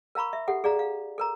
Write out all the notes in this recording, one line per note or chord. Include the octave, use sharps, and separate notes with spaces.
A#4 F5 A#5 B5 C#6
E5
G4 A4 F#5
G#4 D5 F5 A#5
F5
A4 A#4 A#5